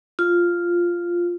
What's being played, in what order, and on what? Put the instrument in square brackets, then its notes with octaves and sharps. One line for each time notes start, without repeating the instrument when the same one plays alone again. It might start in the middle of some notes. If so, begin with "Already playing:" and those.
[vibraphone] F4